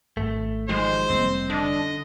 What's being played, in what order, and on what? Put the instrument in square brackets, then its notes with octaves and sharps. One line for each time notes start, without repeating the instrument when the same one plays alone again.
[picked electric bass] G#1 [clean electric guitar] A3
[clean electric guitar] D#3 F3 F#3 [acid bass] G#3 [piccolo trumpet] C5
[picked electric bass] F1 G3 A#3 [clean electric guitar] C4
[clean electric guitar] D3 [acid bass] D4 [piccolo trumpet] D#5